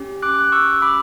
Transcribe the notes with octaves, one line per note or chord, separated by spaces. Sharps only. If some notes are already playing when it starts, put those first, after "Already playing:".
Already playing: C#4 G4
D6 F#6
F#6
C#6 E6
B5 D6